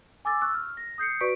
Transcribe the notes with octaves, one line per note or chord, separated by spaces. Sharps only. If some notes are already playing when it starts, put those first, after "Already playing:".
G#5 D6 E6 A6
C#6 E6 F#6
F6
A#6
D#6 G6 C7 C#7
F#4 B4 D5 C#6 B6 D7